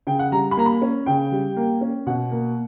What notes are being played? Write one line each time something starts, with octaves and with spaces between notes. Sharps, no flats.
C#3 G5
F#5
G3 A#5
B5
A#3 A#5
B5
C#4
C#3 G5
G3
A#3
C#4
B2 F#5
A#3